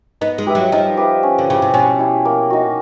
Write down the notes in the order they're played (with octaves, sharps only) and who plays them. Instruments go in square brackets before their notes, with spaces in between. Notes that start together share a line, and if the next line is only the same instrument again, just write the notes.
[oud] B3 [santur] D#4
[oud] G#3
[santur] G4 B4 E5
[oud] F#3
[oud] F3 [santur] D#4
[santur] G4 B4 E5
C#4
[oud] D3
[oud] C#3 [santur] E4 G4
[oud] C3
[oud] B2 [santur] C#4
[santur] E4 G4
A#3
D#4 F#4